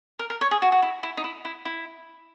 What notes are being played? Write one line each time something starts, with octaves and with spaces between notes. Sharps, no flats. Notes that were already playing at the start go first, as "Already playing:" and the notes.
A#4
A#4
C#5
G#4
F#4
F#4
E4
E4
D#4
E4
E4
E4